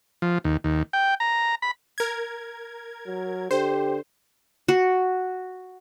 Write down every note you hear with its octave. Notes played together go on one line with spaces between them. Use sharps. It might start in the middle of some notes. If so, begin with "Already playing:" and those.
F3
D#2
D#2
G5
A#5
B5
A#4 G#6
F#3
D3 G4 C5
F#4